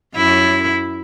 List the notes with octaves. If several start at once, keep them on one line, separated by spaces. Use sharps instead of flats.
F#2 E4